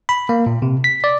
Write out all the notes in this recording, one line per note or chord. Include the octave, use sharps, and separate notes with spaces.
B5
A#3
A#2
C3
B6
D5